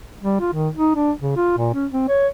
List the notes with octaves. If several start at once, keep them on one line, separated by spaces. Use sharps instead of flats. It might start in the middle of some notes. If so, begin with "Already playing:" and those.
G3
F4
D#3
D#4
D4
C#3
F4
A#2
C#4
C4
C#5